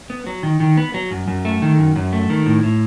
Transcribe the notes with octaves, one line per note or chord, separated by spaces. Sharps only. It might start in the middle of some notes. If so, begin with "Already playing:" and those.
B3
F#3
D#3
D#3
B3
F#3
F#2
F#2
A3
D#3
F#2
F#2
A3
D#3
A2
A2